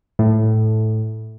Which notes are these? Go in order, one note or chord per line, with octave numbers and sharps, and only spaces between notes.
A2